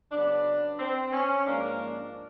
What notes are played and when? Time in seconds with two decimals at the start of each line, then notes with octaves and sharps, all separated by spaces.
0.11 C#3 F#3 B3 D4
0.79 C4
1.13 C#4
1.47 G#2 F3 A#3 D4